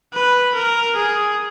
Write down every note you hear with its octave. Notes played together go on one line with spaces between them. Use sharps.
B4
A#4
G#4